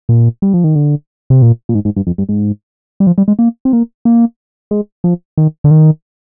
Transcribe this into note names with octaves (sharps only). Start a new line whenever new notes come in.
A#2
G3
F3
D#3
D3
C3
A#2
A#2
G#2
G#2
G2
F2
G2
G#2
G3
F3
G3
G#3
A#3
C4
A#3
A#3
G#3
F3
D#3
D3
D#3